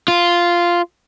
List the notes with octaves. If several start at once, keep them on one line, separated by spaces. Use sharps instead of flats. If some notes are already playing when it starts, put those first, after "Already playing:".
F4